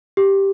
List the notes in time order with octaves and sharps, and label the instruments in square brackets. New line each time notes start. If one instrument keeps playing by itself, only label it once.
[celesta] G4